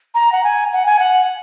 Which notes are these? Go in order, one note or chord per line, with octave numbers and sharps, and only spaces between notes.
A#5
F#5
G#5
F#5
G#5
F#5